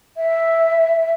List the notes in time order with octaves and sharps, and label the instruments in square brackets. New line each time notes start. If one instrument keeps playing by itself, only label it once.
[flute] E5